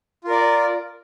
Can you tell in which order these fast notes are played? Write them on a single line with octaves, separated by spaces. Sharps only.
F4 A#4 D5